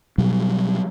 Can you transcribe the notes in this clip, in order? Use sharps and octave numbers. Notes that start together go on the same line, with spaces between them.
B2 F#3 G3